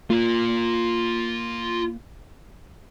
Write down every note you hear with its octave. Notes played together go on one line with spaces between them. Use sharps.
A#3 F4 A#5